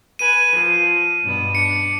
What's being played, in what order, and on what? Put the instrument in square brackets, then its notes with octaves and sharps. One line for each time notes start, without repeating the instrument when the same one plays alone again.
[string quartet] B4 G#5 [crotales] D#7
[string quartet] F3
G2 B2 B3
[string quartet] D4 [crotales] C#7